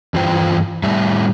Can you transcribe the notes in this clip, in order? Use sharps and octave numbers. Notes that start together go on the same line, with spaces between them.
G2 E3 F4 C5 G5
A2 G3 E5